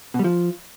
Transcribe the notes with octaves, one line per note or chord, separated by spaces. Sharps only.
B2
G3
F3